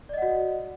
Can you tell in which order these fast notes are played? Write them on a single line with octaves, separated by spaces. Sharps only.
D5 D#5 F#5 F#4